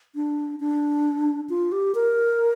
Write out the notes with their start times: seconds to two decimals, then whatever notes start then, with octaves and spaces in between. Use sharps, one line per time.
0.15 D4
0.60 D4
1.50 F4
1.72 G4
1.95 A#4